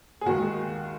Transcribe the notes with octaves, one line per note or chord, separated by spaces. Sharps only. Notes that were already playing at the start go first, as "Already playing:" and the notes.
G#4
D#2 D#3 G#3 F#4